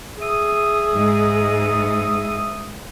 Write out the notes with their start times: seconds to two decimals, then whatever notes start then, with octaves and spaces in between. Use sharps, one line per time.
0.21 G#4 E5 D#6
0.92 G#2